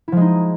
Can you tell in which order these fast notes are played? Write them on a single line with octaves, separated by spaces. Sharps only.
E4 F3 G#3 D#4